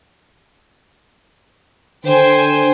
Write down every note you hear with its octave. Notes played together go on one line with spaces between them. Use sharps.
D3 C5 G5 G#5